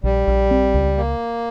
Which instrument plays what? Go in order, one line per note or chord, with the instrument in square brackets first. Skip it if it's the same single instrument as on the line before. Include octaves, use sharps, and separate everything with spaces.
[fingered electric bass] A#1 [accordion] G3
[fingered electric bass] A#1
C4
C#2
[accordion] A#3